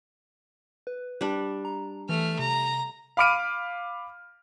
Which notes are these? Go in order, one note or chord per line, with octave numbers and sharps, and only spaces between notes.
B4
G3 D4
A#5
E3 A3 F6
C3 A#5
F5 B5 D6 F6 D7 D#7